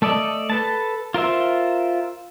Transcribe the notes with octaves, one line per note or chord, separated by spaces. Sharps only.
A3 A4 D5 D#5
A4 B4 A5
F4 A#4 C5 E5